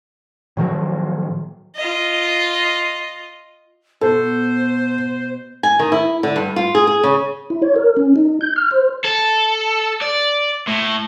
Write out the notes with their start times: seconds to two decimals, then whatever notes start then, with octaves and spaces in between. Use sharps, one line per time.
0.57 A2 D#3 F3 F#3
1.76 F4 D#5
4.01 B2 A4 C5
5.63 G#5
5.79 D#3
5.92 E4
6.23 D3
6.36 G2
6.56 F4
6.75 G#4
6.87 G#4
7.03 C#3
7.50 E4
7.62 C#5
7.76 A#4
7.97 C#4
8.16 D#4
8.41 G6
8.56 F6
8.71 C5
9.05 A4
10.01 D5
10.68 A2